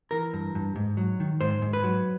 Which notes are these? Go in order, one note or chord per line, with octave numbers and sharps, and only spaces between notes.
E3 A#4
G2
G2
G#2
F#3
D#3
G#2 C5
G#2
B4
F#3